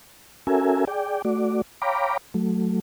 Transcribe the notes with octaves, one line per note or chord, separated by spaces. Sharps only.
C#4 F#4 A4 A#4 E5 G#5
G#4 D5 G5
A3 F#4 D5
C#5 F5 G5 A#5 B5 D6
F#3 A3